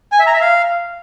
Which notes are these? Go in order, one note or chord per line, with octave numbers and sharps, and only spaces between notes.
G#5
E5
A#5
E5
F5